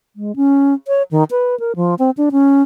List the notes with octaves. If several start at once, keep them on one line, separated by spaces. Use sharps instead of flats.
G#3
C#4
C#5
D#3
B4
A#4
F3
C4
D4
C#4